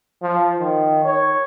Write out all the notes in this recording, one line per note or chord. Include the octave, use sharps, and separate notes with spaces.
F3
D#3
C#5